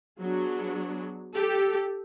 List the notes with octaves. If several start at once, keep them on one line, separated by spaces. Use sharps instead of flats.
F#3 B3 D4 F#4 G#4
G4 A4